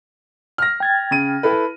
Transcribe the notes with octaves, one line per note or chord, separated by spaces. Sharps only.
F6 A#6
G5 G#6 A6
C#3 D#7
E4 A4 B4